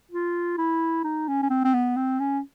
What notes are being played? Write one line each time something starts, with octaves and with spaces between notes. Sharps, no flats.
F4
E4
D#4
C#4
C#4
C4
C4
B3
C4
C#4